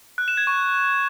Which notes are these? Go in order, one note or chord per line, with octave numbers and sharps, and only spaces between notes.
F#6
E7
G#6
C#6